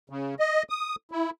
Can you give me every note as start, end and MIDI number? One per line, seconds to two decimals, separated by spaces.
0.10 0.35 49
0.40 0.63 75
0.70 0.95 87
1.11 1.30 64